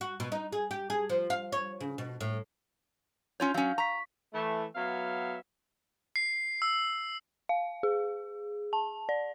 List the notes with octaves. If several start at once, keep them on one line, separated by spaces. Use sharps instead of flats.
F#4
B2
D#4
G#4
G4
G#4
F3
F5
C#5
C#3
B2
A2
C#4 F4 C#5 G6
F#3 C#4 F5
A#5 C#6 B6
E3 A3
F#3 B3 E5 F5
C7
E6
F5
G#4
A5
D5